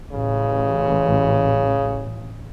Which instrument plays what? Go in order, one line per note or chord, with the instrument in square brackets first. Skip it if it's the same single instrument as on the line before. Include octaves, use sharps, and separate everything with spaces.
[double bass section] A1 [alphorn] C#3